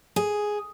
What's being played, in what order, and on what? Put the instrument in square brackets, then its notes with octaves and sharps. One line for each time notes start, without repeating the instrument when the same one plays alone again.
[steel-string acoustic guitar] G#4